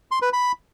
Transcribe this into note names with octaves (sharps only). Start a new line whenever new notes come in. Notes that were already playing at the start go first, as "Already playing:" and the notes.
C6
B4
B5